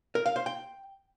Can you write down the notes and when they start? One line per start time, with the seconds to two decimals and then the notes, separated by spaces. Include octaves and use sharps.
0.15 A#4
0.26 F5
0.36 C5
0.46 G5